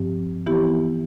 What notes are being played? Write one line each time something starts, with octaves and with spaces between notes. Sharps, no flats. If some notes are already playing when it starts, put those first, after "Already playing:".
Already playing: G2 F3 C4 G4
E3 B3 E4 G4